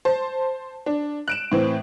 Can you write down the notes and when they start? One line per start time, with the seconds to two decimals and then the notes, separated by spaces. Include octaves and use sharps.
0.05 C5 A5
0.86 D4
1.28 F#6 D7 E7
1.52 A2 E3 C4